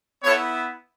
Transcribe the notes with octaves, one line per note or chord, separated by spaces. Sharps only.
B3 E4 A4 C#5